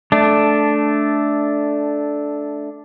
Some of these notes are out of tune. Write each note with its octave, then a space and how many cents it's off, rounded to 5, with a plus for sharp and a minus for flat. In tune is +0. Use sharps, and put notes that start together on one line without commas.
A3 -10 D4 +0